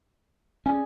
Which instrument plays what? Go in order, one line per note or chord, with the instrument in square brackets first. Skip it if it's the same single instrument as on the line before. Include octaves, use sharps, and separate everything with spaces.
[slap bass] C#4 [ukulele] G#4 D5 G#5